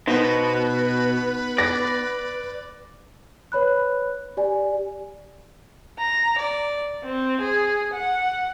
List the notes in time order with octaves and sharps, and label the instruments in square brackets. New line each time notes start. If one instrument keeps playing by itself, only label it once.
[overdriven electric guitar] B2 [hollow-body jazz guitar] B3 D#4 C5 [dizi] B4
[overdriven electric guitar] D5 [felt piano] A#6
[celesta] B4 C#5 B5 F#6
G4 D5 G#5
[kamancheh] A#5
D5
C4
G#4
F#5